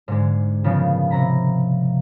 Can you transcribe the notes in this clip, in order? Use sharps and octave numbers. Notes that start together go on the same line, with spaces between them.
G#2 D3 G#3
A#2 C#3 F3 G#3 B3
C3 A#5 B5